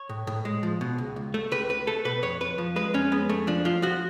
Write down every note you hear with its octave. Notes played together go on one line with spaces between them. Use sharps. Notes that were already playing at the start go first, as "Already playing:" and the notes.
Already playing: C#5
A2
A2
G#3
F3
B2
C#2
C#2
A3
C#2 B4
C#2 B4
A3 A4
B2 B4
F2 C#5
F2 B4
F3
G#3 B4
F2 C#4
G#3 B3
F2 A3
F3 D4
F3 F4
F3 F#4